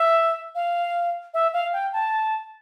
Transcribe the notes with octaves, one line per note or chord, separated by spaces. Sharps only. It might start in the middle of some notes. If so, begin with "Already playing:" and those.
Already playing: E5
F5
E5
F5
G5
A5